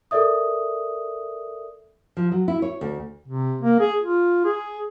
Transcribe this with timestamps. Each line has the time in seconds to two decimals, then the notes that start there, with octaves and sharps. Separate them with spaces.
0.11 A4 A#4 D5 E5 D#6
2.17 F3
2.32 F#3
2.48 E4
2.62 C#5
2.81 D2
3.28 C3
3.61 A#3
3.80 G#4
4.02 F4
4.45 G#4